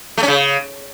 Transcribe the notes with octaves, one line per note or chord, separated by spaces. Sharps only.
A3
C#4
C#3